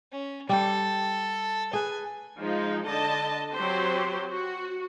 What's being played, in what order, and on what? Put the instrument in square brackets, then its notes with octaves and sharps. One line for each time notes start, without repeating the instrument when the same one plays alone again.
[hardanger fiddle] C#4
[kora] G3 G4 [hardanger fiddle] A4
[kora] G#4 B4 [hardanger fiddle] G#5
[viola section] F3 G#3 D#4
D3 D#5 A5
F#3 C4 G4 C5
F#4